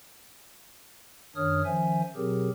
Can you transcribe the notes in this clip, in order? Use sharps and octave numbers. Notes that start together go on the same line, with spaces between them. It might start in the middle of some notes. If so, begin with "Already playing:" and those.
F#2 D#3 D4 C#5 D#6 F6
D#3 F3 C#4 C5 E5 G#5
B2 F#3 C4 G4 G#4 A#4